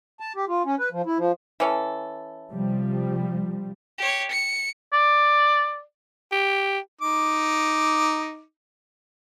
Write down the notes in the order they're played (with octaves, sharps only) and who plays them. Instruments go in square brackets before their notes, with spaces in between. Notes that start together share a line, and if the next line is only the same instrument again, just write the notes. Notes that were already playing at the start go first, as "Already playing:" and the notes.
[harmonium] A5
G4
F4
C#4
B4
F3
E4
F3
[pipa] E3 C#4 A4
[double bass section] C3 F3 G3
[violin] G4 C#5
C#7
[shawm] D5
[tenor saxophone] G4
[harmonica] D#4 D6